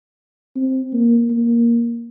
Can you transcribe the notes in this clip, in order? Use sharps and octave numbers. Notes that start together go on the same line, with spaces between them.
C4
A#3
A#3